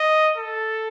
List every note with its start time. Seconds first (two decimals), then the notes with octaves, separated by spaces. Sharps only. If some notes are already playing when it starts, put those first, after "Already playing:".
Already playing: D#5
0.37 A4